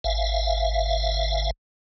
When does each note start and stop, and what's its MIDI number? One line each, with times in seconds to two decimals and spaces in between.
0.04 1.51 32
0.04 1.51 76
0.04 1.51 77